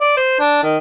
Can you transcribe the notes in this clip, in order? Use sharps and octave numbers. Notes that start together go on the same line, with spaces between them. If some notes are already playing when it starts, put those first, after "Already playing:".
D5
C5
D4
D#3